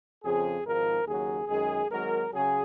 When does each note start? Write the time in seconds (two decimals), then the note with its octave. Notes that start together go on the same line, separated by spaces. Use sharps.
0.23 F2 C#3 F3 G#4
0.65 G#1 G#2 F3 A#4
1.07 D#2 C#3 F#3 G#4
1.48 F#2 D#3 G#3 G#4
1.91 G#1 G#2 F#3 A#4
2.32 C#3 F#3 G#4